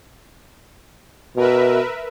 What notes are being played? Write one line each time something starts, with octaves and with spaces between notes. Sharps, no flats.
B2 A#4 B4 E5